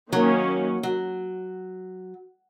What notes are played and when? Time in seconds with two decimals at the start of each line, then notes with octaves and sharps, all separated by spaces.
0.12 D#3 F#3 A#3 C#4
0.83 F#3